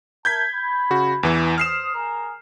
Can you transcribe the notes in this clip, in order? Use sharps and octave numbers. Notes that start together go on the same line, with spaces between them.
A#4 E5 A5 G6 G#6 B6
B5
C#3 F#4
E2 E3
C5 D#6 F6 C7 E7
G#4 A#4